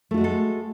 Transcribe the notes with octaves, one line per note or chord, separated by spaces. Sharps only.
G#3 A3 F4 F#4 A4